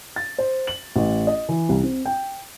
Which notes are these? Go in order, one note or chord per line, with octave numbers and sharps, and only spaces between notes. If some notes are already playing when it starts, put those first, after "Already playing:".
A6
C5
F#7
A1
D#5
E3
C2
C4
G5